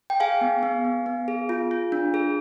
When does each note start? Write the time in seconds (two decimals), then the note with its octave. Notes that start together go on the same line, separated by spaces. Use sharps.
0.10 G5
0.20 G#4 F5 G#5
0.41 B3
0.63 B3
0.85 B3
1.06 B3
1.28 G#4
1.49 F4
1.71 F4
1.92 D4
2.14 G#4